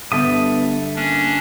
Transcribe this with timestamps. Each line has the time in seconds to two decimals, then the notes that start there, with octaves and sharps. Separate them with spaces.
0.12 G1 B3 G4 A4 E5 D#6
0.96 A#3 C#4 D4